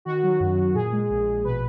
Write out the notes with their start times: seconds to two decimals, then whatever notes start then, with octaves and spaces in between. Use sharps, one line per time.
0.05 D#3 F#4
0.23 F#3
0.40 F#2
0.57 F#2
0.75 A#2 G#4
0.93 G#3
1.10 A#1
1.27 A#1
1.44 B2 B4